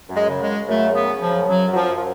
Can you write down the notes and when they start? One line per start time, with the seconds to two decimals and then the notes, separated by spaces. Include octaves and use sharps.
0.10 F#2
0.15 G#3
0.29 C#3
0.42 G#3
0.48 C#3
0.69 F#2 A3
0.89 C#3
0.95 B3
1.09 C#3
1.22 F3
1.29 F#2
1.48 F#2 F#3
1.67 F#2 F#3
1.75 F3
1.88 F#2
1.97 F3